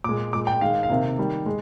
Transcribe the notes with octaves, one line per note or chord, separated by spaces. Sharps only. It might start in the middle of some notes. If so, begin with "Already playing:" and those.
A#2 G#3 D6
A#2 G#3 D6
G5
D#3 G#3 F5
F5
C3 D#3 A#3
D#3 G3 A#3
G#3